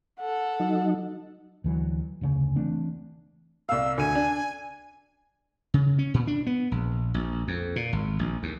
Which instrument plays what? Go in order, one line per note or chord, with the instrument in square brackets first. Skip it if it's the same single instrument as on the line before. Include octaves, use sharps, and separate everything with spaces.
[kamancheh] A4 F#5
[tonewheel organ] F#3 D#4
[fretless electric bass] D2 E3 F#3
F1 D2 C#3
E3 A3 C4 D4
[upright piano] C2 F5 [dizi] E6
[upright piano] D2 D#7 [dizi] G#5
[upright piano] D4
[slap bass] C#3
C#4
A#2
D4
B3
A#1
A#1
F2
A#2
G#1
A#1
D#2